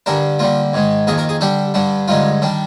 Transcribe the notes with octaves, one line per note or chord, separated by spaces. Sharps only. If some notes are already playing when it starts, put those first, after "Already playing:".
G2 D3 G3 D4 A#4
D3 G3 A#3 F4
G#2 D#3 G#3
F2 D#3 A#3 G#4
A#4
G#4
D3 G3 D4 G4
G2 D3 G3 D4
G2 D3 G#3 D#4 F4
D#3 G3 D4